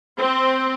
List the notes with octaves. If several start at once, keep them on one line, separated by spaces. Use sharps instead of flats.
C4